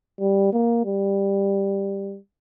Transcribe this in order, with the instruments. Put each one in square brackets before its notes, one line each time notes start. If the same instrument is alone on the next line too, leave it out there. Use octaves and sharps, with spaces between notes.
[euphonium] G3
A#3
G3